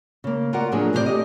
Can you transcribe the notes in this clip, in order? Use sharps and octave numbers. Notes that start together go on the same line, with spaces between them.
C#3 A#3
F4 F#4 A#4 D5 F#5
A2 F3 F#3 A#3 D4 G#4
F2 A2 C3 D#4 C5 D5
G4 A4 D5 D#5